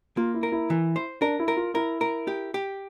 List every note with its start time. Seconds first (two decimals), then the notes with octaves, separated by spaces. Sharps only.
0.17 A#3 F4
0.34 E4
0.43 A#4
0.52 E4
0.70 E3
0.96 C5
1.21 D4 A#4
1.39 E4
1.48 A#4
1.57 F4
1.74 E4 A#4
2.01 A#4
2.27 G4
2.54 G4